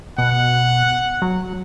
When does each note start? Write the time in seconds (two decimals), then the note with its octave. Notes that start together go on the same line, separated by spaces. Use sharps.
0.18 B2 F#5
1.22 F#3